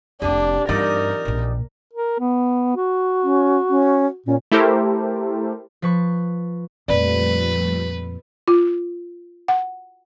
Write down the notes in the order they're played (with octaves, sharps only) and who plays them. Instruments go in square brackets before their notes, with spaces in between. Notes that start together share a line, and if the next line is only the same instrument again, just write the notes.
[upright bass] F1 E4 [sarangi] D4 [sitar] G4
[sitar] E2 D#4 D5 [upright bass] G2 [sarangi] A#4
[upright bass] A#1 A#2
[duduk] A#4
B3
F#4
[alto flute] C#4
C#4
[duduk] A#2 [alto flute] C#4
[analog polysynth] A3 E4 G4 A4 A#4 C5
[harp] F3 B4 C#6
[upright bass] F2 A#2 [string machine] F3 G3 A3 [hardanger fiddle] B4 [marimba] D5
[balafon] F4
F#5